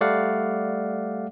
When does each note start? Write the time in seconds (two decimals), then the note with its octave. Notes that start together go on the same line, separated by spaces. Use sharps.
0.01 G3 A3 D5 F5 F#5